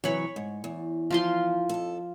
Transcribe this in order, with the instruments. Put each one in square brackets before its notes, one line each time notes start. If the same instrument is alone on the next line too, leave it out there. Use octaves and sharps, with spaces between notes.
[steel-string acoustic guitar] C3 E3 F#3 [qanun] C#5 B5
[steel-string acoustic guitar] G#2
E2
[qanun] F3 F4 C6
[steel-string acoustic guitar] F2 A4